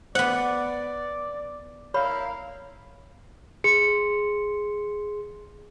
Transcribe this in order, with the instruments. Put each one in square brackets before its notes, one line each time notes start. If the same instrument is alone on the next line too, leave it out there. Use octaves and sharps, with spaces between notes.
[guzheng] B3 F#5 [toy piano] C5 [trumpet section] D5
[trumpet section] E4 A#4 F5 [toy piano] C#5 B5
[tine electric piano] G#4 C6 [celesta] C#7